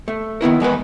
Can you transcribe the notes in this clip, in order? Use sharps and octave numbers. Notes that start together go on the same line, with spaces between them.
A3
D#3 B3 E4 A#4
E2 G#3 A#4 B4